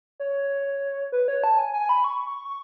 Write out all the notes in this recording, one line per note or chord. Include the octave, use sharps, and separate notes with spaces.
C#5
B4
C#5
A5
G#5
G#5
B5
C#6